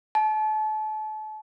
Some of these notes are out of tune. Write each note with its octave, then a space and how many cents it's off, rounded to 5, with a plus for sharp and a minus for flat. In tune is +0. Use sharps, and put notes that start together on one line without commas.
A5 -35